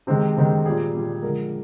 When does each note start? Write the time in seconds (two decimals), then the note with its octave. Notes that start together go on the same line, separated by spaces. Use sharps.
0.07 C3 D#3 G#3 C4
0.37 C3 D#3 G#3
0.65 A#2 G3 G#4
0.94 A#2 G3
1.23 D3 F3 G#3 A#4